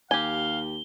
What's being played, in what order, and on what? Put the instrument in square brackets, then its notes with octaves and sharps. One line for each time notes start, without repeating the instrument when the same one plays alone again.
[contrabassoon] D#2 [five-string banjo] G4 G#5 [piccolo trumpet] F5 [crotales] G7